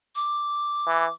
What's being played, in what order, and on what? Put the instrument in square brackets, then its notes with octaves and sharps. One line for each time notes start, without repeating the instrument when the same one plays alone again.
[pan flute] D6
[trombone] E3